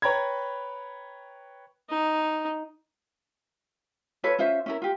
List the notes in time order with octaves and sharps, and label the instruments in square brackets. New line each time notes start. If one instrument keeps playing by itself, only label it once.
[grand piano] B4 C#5 G5 A#5 B5 G#6
[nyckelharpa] D#4
[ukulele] F4 A4 B4 C#5
C#4 F4 C5 E5
C#4 E4 A#4
F4 G4